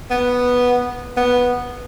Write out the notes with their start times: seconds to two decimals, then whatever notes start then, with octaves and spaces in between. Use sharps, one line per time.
0.11 B3
1.17 B3